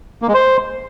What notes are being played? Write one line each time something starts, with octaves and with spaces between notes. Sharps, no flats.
A#3
G#3
C5